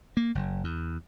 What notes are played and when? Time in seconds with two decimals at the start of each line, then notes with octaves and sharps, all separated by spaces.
0.17 A#3
0.35 F#1
0.64 E2